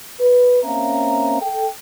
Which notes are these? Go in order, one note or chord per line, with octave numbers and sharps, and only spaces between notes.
B4
A#3 C4 C#4 E5 F5 A#5
A4 G5